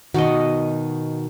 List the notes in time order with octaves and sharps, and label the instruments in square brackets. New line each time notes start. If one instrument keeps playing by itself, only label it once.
[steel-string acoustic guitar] B2 D#3 [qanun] F#4 D#5